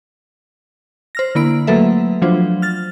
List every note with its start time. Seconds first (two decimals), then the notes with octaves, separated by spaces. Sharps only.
1.15 C5 F6 A#6
1.35 D3 A#3 E4 B5 D7
1.67 F#3 A3 A#3 A4 B4 E5
2.22 F3 F#3 D4 F4 C5
2.62 F6 A6